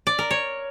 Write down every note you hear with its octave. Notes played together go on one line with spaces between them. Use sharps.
D5
A#4
C#5